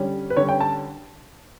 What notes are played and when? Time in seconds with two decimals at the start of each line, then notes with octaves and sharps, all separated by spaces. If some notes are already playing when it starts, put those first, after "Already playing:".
Already playing: D3 G3 C#4
0.30 B4
0.37 D3 G3 C#4 C#5
0.49 G5
0.61 A5